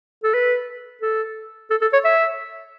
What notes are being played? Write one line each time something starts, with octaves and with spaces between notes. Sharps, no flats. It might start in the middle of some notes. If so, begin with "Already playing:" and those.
A4
B4
A4
A4
A4
C#5
E5